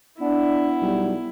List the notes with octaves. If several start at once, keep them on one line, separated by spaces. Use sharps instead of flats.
B3 D4 E4
B1 G3